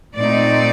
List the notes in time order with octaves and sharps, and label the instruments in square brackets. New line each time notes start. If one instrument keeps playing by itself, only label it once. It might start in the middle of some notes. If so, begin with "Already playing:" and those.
[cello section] A#2 A3 C4 D#4 D5